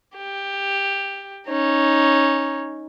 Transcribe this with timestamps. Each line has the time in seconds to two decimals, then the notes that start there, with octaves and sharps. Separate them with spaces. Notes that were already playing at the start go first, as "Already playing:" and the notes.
0.17 G4
1.47 C#4 D#4